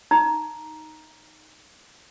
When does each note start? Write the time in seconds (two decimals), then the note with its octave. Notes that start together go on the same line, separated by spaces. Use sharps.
0.11 D#4 A#5